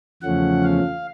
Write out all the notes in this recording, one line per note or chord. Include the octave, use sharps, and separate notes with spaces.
E2 C#3 F3 A3 C#4 F#5
F5